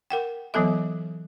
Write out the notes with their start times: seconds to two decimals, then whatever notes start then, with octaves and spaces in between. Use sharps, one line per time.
0.10 A#4 F#5 G5
0.54 E3 F#3 B3 A4 E5